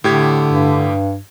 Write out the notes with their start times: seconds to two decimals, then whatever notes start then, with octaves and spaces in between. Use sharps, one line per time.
0.04 A2 D3 G4 G#6
0.46 G2